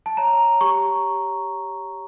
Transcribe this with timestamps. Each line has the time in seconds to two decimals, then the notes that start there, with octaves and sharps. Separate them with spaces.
0.06 A5
0.17 C#5 A#5
0.61 G4 C#6